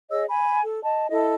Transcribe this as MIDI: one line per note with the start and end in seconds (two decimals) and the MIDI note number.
0.10 0.24 68
0.10 0.24 73
0.10 0.24 75
0.10 0.24 88
0.29 0.61 80
0.29 0.61 83
0.62 0.82 69
0.82 1.09 75
0.82 1.09 81
1.09 1.34 64
1.09 1.34 69
1.09 1.34 75